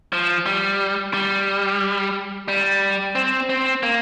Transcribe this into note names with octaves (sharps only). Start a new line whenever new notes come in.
F3
G3
G3
G3
C4
C4
A#3